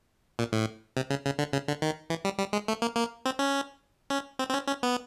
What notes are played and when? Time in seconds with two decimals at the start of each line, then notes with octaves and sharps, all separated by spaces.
0.39 A#2
0.53 A2
0.97 C3
1.10 C#3
1.25 C#3
1.39 D3
1.53 C#3
1.68 D3
1.82 D#3
2.10 E3
2.25 G3
2.39 G3
2.53 G#3
2.68 A3
2.82 A#3
2.96 A#3
3.26 C4
3.39 C#4
4.10 C#4
4.39 C4
4.49 C4
4.54 C#4
4.68 C#4
4.83 B3